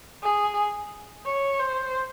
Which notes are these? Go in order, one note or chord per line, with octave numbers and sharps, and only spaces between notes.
G#4
C#5
C5